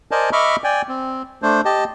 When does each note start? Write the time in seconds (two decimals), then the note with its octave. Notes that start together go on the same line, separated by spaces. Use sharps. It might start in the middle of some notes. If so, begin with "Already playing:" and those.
0.11 A#4 C5 D5 D#5 G#5 A5
0.33 D#5 E5 B5 C#6 D6 F6
0.64 D5 G5 G#5
0.89 C4
1.42 A3 D4 C5
1.65 G4 D#5 A5